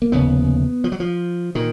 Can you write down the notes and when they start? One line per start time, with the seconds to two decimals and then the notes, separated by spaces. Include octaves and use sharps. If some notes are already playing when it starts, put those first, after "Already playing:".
0.02 A#3
0.12 F1 D#2 C#3 B3
0.84 F3
0.92 F#3
1.00 F3
1.55 A#2 D#3